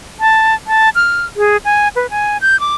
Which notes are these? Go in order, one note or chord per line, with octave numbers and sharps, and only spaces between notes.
A5
A5
F6
G#4
G#5
B4
G#5
G6
D6